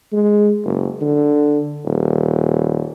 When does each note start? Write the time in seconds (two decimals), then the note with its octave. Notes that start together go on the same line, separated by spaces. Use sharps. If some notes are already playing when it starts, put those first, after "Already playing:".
0.12 G#3
0.64 F#1
1.01 D3
1.86 D#1